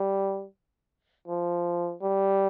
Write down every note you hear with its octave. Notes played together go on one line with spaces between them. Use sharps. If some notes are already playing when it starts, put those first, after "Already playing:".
Already playing: G3
F3
G3